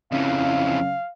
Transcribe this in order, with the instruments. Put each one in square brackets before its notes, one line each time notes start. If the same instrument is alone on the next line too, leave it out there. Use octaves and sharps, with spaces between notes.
[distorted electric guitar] F2 E3 [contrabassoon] C#3 [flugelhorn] F5